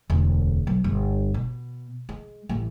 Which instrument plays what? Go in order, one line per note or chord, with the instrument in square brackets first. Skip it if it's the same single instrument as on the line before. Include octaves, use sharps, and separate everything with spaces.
[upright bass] E1 D2
B1
G1
B2
G#3
A1 E3